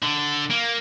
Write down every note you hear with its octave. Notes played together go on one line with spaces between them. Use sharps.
D3
A#3